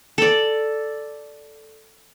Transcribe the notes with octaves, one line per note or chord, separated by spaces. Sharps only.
A4 D5